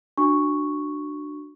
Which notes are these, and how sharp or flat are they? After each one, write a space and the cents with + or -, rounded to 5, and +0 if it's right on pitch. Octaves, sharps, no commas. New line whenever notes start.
D4 +20 F#4 +0 C#6 +0